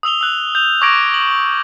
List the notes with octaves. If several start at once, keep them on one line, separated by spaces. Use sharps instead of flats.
D#6 E6 F7 G7
E6 F#6
G6 F7
C#6 D6 E6 G#6 A#6 D7
F#7